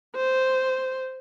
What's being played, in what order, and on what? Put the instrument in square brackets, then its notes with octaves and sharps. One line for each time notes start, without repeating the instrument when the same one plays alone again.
[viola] C5